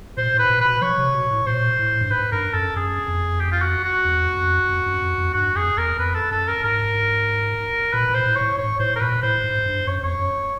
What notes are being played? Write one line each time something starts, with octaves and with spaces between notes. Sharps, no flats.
A#2 C5
A2 B4
A#2
B2 B4
F3 C#5
C3
B2
A2
A#2 C5
A2
G2
G#2 B4
G2 A#4
F#2 A4
F#2 G#4
F2
G4
F4
F#4
F#4
E2
F2
F2
F#2
F2
F2
G2 F#4
F2 G#4
E2 A#4
F2 B4
A4
F#2 A4
A#4
G#2 A#4
A#2 B4
A#2
C5
A2
C#5
A2
G#2 C#5
A2 C5
A#4
A#2 B4
A2 C5
G#2
G2
F#2 C#5
F2 C#5
F#2